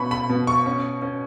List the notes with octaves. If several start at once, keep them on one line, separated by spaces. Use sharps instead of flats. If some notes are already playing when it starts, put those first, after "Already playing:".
Already playing: B2 C#4 B5 C#6
B5
B2
C#6
C#4
C#4